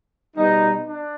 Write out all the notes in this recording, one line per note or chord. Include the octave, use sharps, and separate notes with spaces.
B2 G3 B3 D#4
D4